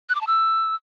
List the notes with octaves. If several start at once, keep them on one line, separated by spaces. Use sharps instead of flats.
F#6
D6
A5
E6